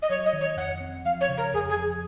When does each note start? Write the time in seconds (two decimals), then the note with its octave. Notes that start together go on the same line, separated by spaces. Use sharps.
0.02 D#5
0.09 F#3 C#5
0.25 D#5
0.33 D#3
0.40 C#5
0.56 F2 F#5
0.80 C4
1.05 F3 F5
1.20 C#5
1.29 C#3
1.37 A#4
1.53 F2 G#4
1.69 G#4
1.76 F2